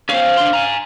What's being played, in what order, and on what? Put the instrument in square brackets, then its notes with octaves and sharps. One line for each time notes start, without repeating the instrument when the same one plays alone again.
[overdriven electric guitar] C#4 C5 [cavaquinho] F5
[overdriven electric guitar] D4 C6
G#5 A#5